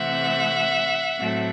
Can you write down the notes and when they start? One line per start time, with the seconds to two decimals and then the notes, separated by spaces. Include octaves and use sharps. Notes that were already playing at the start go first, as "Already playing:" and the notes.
Already playing: C3 E3 A3 C4 E5 F#5
1.19 A2 F#3 A3 C4